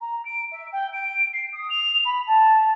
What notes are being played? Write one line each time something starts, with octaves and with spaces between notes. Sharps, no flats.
A#5
D7
E5
G5
D7
C7
D#6
F7
B5
A5